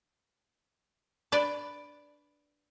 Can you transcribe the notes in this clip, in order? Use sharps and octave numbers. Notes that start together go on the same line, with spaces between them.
D4 B4 D5